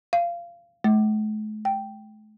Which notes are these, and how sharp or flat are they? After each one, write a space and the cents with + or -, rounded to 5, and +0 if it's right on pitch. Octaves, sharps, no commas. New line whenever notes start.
F5 -20
A3 -45
G5 -5